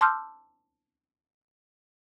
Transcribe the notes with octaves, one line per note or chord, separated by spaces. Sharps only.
A5 C6 D6 E6 F6 G6